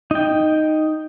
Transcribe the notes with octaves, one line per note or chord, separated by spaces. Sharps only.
D#4 G5